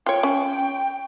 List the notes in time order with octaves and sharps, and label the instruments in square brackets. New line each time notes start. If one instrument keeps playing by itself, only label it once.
[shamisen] F4 C#5 [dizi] G5
[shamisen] C#4